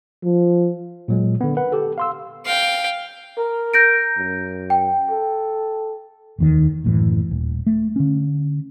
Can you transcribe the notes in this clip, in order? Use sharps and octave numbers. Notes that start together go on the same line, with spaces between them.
F3
A#2 F#3 G#3
D3 B3
A#4 B4 F#5
G4 A4
F5 C6 E6
F5 G5
A#4
G6 A#6 D7
F#2
G5
A4
F1 D#2 D#3
F#1 D2 A2 E3
D#1
A3
D3 C#4